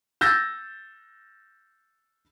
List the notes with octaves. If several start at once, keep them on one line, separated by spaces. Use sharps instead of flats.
E6 G6 A6 A#6